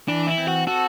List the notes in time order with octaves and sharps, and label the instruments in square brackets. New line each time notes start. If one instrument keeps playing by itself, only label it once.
[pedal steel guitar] E3 [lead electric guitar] D4
[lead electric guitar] E4
[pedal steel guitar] C4
[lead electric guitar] F#4
[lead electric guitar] F#4 [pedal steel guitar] A4